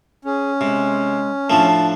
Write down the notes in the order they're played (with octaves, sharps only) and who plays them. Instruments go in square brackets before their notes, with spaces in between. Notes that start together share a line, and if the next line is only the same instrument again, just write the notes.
[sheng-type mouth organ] C#4 [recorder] G#4
[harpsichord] C3 [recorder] G#3
[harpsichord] A2 F3 A3 [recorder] D4 [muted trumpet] A5